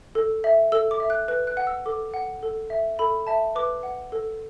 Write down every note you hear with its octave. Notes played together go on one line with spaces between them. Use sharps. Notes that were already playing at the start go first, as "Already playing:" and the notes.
A4
E5
A4 E6
D6
E5
F#6
B4 F#6
F#6
F#5
E6
A4 D6
F#5
A4
E5
A4 B5
E5 A5
B4 D6
F#5
A4